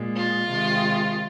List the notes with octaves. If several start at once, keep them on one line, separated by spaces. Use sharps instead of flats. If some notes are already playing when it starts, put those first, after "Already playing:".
Already playing: A#2 G#3
F4
C3 D#3 G#3